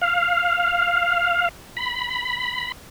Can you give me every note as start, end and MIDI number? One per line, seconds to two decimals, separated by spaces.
0.01 1.49 77
1.77 2.72 83